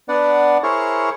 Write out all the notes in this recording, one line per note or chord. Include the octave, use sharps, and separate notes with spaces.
B3 D4 B4 D5 F#5
E4 G#4 A#4 C5 C#5 C#6